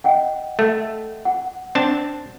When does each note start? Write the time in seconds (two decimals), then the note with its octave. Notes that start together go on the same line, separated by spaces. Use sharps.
0.04 D#5 F#5 G5
0.59 A3
1.25 F#5
1.75 C4 D4 A5